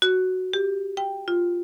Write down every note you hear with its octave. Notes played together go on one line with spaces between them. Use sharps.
F#4
G4
G5
F4